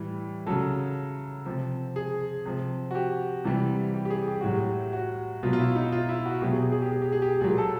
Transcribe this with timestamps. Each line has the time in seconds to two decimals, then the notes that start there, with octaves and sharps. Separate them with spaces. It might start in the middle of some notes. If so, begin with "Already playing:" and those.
Already playing: A2 E3 G3
0.46 C#3 F#3 A4
1.46 C3 F3
1.96 G#4
2.45 C3 F3
2.91 F#4
2.95 G4
3.44 C3 E3 G3
3.94 G4
4.05 G4
4.10 G#4
4.27 G4
4.41 A2 F#3 F#4
4.55 G4
4.93 F#4
5.43 B2 F#3 F4
5.53 F4
5.59 E4
5.76 D#4
5.92 F4
6.09 E4
6.25 F#4
6.42 B2 F#3 G4
6.52 G#4
6.62 G4
6.72 G#4
6.82 G4
6.92 G#4
7.02 G4
7.12 G#4
7.22 G4
7.41 A#2 F#3 G#4
7.58 A4